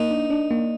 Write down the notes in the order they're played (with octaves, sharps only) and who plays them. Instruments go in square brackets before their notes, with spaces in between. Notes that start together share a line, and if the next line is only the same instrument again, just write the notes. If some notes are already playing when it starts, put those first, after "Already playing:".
Already playing: [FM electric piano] A#3 [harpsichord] D#4
[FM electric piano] D4
D4
A#3